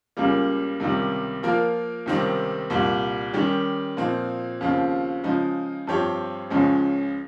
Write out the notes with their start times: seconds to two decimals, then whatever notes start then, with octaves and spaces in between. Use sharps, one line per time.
0.17 C#2 C#3 G3 A#3
0.80 C#2 C3 D#3 G3
1.43 F3 A#3 F4 A#4
2.06 C#2 C3 D#3 G3 C4
2.70 C2 A#2 G3
3.33 D#3 G3 C#4 G4
3.97 A#2 F3 C4 D#4
4.61 D#2 C#3 F3 C4 F4
5.24 C#3 F3 G#3 D#4
5.87 G2 F3 C4 G4 C#5
6.50 C#2 C#3 F3 G#3 C#4